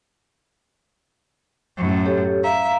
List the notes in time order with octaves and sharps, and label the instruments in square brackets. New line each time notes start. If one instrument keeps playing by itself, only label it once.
[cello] F#2 A2
[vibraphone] G4 A4 C#5
[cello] E5 [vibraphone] F5 A#5